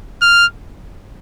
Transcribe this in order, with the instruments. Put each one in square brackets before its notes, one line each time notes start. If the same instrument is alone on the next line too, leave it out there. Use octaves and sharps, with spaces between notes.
[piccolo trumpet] F6